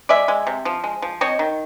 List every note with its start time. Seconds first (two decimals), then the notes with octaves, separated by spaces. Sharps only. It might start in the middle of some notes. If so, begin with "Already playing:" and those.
0.09 G#3 D5 E5
0.28 G#3
0.47 C3
0.65 F3
0.84 G#3
1.02 F3
1.21 C4 C#5 D#5
1.39 D#3